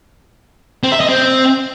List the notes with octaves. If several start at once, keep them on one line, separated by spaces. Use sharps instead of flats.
C4
E5
D#5
C4